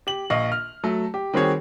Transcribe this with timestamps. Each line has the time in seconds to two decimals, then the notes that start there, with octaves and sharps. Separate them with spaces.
0.07 G4 F#7
0.30 A#1 D#5 F5 C#6
0.52 F6
0.83 F#3 A3
1.14 G4
1.33 D#3 G3 C4 F#4 G#4 C#5